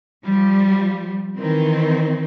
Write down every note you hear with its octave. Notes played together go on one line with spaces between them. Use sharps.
F3 G3
D#3 E3 C4